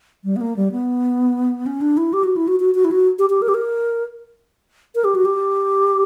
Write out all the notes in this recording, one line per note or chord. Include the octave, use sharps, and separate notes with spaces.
G3
B3
A#3
G3
B3
C#4
D4
E4
G4
F#4
E4
F#4
F#4
F#4
E4
F#4
G4
G4
A#4
G4
A#4
A#4
G4
F#4
G4